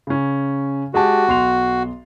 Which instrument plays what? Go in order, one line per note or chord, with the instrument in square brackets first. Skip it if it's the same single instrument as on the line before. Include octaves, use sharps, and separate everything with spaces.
[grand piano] C#3 C#4
[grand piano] G#3 G4 A5 [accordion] F#4
[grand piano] B1 C6 F7